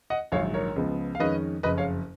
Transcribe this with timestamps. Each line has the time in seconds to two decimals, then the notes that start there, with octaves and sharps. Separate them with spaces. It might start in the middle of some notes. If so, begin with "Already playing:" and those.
0.10 D#5 F#5
0.32 A#1 G#2 D#3 F#3 C#5 F5
0.54 A#4 C#5
0.76 C#2 C#3 F3 B3
1.15 F5
1.19 F2 D#3 G#3 C#4 B4 D#5
1.63 F#1 F2 C#3 B4 D#5
1.77 C#5 F5